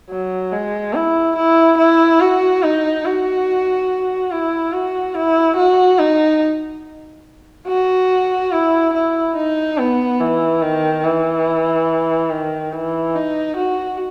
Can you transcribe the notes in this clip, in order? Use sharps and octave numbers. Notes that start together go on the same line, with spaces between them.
F#3
G#3
E4
E4
E4
F#4
D#4
F#4
E4
F#4
E4
F#4
D#4
F#4
E4
E4
D#4
B3
E3
D#3
E3
D#3
E3
D#4
F#4